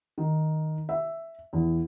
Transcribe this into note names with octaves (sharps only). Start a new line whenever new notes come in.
D#3
E5
E2